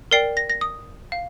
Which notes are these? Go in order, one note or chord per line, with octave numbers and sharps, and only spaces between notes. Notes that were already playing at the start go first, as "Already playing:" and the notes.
A#4 D5 G5 C7
A#6
A#6
D#6
F5